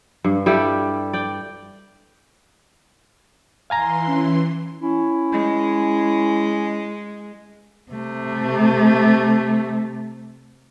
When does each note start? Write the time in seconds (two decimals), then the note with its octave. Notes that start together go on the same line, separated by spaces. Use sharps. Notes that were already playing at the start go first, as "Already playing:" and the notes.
0.24 G2
0.46 G3 E4 G4 A4
1.13 D5 G5
3.70 E3 F5 G#5 A#5 C6
4.08 C#4
4.81 C#4 E4
5.32 G#3
7.92 C3 A3